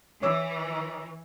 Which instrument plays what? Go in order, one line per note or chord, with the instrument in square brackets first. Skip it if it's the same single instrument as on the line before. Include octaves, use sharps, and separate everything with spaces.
[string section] E3 [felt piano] C#5 D6 E6